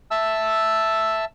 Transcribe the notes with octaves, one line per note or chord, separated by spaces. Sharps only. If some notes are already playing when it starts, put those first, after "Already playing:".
E5 A5 E6